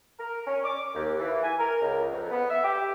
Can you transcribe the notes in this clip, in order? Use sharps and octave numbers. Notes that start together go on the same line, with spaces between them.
A#4
C#4
D6
D#2
E3
G#5
A#4
C#2
F2
B3
E5
G4